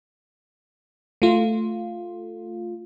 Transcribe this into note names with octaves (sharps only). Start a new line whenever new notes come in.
A3 F4